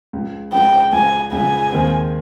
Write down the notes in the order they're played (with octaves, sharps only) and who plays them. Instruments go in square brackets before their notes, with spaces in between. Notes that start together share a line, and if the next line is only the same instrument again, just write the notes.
[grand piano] C#2 C#3 F3
[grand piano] C#2 C#3 F3 [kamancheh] G5
[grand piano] C#2 C#3 F3 [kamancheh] G#5
[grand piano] C#2 C#3 F3 [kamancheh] G#5
[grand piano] D#2 D#3 G#3 C4